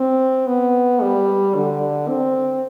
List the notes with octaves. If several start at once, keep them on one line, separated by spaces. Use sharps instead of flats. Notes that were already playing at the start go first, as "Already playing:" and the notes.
Already playing: C4
B3
G3
D3
C4